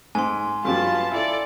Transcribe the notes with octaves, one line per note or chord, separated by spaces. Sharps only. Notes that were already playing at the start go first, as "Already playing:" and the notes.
G#2 G#5 C6
G2 F#3 G3 B3 F4 A5
E4 A4 D5